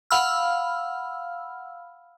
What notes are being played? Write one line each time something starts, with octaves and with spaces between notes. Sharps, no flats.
F5 F#5 B5 E6 F6